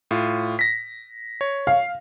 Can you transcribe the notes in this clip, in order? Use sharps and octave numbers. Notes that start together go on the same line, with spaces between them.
A2 F4
A#6 B6
C#5
F5